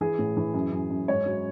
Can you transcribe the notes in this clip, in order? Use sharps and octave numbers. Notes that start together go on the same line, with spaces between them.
E3 G#4
A2
E3
F#2
F#2
F#2
G#2 C#5
F#3